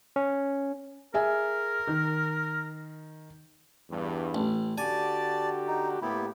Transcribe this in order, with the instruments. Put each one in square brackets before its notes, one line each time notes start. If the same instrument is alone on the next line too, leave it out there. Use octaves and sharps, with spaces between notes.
[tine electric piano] C#4
[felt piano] G#4 E5 G#5 [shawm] A#4
[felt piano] D#3
[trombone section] E2 G2
[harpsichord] A1
[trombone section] D3 F#4 G4 [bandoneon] D5 A5 [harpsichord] G#5
[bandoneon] D#4
[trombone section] A2 A#3 G4 [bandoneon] B3 E4